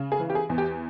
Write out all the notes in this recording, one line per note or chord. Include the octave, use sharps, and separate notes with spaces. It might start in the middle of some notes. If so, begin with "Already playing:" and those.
Already playing: C#3
G#4
E3
G4
G#4
E2
G4